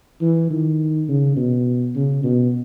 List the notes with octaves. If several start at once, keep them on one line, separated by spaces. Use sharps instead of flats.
E3
D#3
C#3
B2
C#3
B2